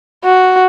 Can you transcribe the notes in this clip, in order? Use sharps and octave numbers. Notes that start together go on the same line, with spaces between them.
F#4